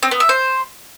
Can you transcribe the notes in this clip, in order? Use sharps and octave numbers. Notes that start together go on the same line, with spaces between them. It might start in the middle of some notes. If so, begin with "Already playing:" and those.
C4
B3
E5
C5